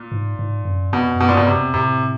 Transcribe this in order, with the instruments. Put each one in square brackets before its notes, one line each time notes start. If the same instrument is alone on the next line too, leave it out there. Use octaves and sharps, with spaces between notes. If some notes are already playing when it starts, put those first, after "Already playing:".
Already playing: [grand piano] A#2
[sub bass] G#2
G#2
F#2
[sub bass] F2 [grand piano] B2
[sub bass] F#2
[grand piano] B2
A#2
[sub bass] G2 [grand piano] B2
[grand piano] C3
[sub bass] F2
[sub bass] A2 [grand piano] C3